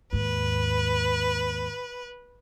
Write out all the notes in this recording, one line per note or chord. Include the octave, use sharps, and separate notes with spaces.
D#2 G#2 B4